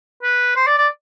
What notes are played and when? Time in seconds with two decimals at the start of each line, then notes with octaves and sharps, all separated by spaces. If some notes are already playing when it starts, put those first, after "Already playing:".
0.23 B4
0.56 C5
0.67 D5
0.78 D5